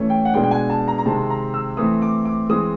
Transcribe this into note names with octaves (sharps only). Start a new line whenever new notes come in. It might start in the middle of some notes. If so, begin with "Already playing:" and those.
Already playing: E3 A3 C#4
G5
F#5
B2 G#3 B3 D4 G5
G5
G#5
A5
A#5
A#5
C3 D#3 G#3 C4 A5
A#5
E6
E3 A3 C4 D#6
D6
D6
E3 G#3 C4 D#6